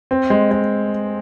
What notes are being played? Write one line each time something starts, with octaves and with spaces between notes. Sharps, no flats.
C4
G#3
G#3